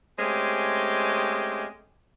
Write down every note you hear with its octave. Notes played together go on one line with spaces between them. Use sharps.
G#3 A3 C4 C#4 G4